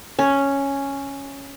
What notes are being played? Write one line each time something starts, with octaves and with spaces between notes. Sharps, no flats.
C#4